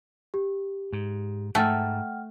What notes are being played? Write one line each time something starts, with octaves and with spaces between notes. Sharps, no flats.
G4
G#2
G#2 A3 F#5 G5 F6